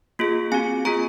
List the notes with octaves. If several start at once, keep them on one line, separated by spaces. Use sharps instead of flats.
A#3 F4 G#4
C4 F#4 G#5
A#3 F4 G#4 A#5